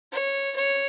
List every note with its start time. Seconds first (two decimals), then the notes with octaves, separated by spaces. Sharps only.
0.12 C#5
0.56 C#5